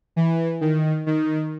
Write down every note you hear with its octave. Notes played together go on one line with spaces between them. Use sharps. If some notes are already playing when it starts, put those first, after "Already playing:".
E3
D#3
D#3